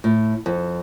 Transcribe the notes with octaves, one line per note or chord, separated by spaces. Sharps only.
A2
F2